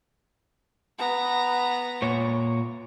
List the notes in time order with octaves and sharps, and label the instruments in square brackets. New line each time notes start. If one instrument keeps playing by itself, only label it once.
[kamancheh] B3 A#5
[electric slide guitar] A#2 C#5